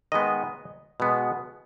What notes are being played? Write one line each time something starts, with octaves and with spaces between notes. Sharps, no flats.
D#3 G#3 B3 D#5
B2 G#3 B3